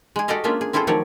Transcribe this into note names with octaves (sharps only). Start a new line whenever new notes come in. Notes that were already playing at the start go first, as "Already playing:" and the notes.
G#3 G#4
F#4 G4 A4 D5 D#5 F5
G#3 A#3 C#4 D4 F4 E5
G#4
C4 E4 F4 G#4 A4 C5
D#3 F3 F#3 A3 C#5 D5